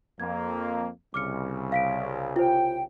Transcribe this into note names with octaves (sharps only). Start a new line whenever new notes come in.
F2 A#3 G#6
C2 C#3 D6 F6 C#7
F5 B6 D7
F4 C5 G5